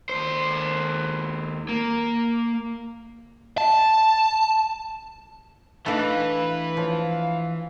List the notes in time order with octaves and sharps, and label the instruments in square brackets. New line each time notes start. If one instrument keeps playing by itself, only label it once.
[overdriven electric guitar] D#2 C5
A#3
[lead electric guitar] A5
[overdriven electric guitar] E3 [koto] A3 D4 D#4 [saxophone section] B4 [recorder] F5
[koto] F3 [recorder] C#5
[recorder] F5